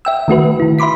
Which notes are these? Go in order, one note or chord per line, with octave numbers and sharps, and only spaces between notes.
E5 G5 E6
D#3 A3 F#4 B4
D#3 E4
E5 B5 C6 D6 B6